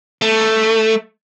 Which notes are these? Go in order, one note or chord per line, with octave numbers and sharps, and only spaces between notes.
A3